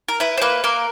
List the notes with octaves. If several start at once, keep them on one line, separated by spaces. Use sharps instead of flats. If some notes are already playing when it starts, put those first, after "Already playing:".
A#4
E4 B4
C5
A#3 B4
A#3 A#4